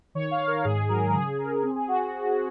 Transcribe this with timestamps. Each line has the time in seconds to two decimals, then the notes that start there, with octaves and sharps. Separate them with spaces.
0.15 D#3 C#5
0.31 F5
0.40 D#3
0.48 A#4
0.64 G#2 G#4
0.89 F#3 A#4
1.14 C#3 G#4
1.38 C#3 A#4
1.63 C4 G#4
1.75 G#4
1.88 F#4